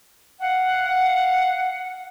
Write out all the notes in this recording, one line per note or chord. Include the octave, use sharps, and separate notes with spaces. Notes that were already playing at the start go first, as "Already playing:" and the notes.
F5 F#5